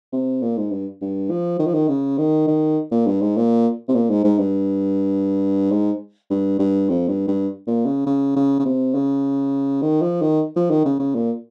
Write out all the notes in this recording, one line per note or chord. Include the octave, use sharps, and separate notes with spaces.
C3
A#2
G#2
G2
G2
F3
D#3
F3
D#3
C#3
D#3
D#3
A#2
G2
G#2
A#2
C3
A#2
G#2
G#2
G2
G#2
G2
G2
F2
G2
G2
A#2
C#3
C#3
C#3
C#3
C3
C#3
D#3
F3
D#3
F3
D#3
C#3
C#3
A#2